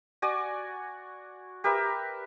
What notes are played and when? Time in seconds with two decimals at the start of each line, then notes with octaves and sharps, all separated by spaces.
0.22 F#4 D5 G#5
1.64 G4 A#4 B4 E5